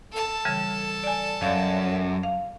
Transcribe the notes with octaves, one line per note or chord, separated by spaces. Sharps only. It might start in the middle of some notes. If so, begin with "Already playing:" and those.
A4 A5
C#3 E3 G3
D5 G#5
F#2 D5 F5
F5